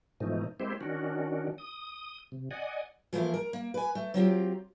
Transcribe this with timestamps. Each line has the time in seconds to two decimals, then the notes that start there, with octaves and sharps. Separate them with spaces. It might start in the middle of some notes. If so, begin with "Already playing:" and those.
0.20 G#2 B2 E3 F3 A3 D#4
0.60 G#3 A#3 C4 E4 G4 C5
0.81 D#3 C#4 D4 F#4
1.58 D#6
2.32 C3
2.51 D5 D#5 F#5 G#5
3.13 E3 F3 A3 A#3 E4 F4
3.34 A#4
3.53 A#3
3.74 B4 G#5
3.95 A3
4.14 F#3 C4 F4 G4